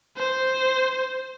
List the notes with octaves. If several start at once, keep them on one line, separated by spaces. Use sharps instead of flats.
C5